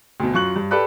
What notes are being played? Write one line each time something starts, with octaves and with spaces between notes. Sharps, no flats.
D2 B2
F#2 F4 C#6 F#6 F#7
G2
G4 A4 B4 D5 B5 F#6